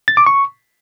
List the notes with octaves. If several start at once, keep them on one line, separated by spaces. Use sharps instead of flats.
A6
D6
C#6